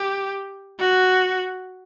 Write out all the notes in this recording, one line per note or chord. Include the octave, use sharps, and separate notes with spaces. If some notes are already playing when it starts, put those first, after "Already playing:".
Already playing: G4
F#4